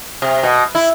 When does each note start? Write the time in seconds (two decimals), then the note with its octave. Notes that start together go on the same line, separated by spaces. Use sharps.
0.22 C3
0.43 B2
0.75 E4